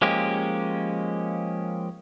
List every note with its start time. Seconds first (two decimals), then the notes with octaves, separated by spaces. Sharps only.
0.02 F3 G#3 A#3 C#4 G4